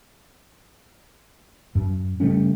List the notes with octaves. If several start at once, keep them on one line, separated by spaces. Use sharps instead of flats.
F#2
C#3 G3 A3 C#4